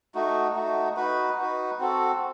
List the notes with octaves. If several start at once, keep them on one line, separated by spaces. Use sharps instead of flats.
A3 D#4 F#4
A3 D#4 F#4
D#4 F#4 B4
D#4 F#4 B4
C4 F#4 A4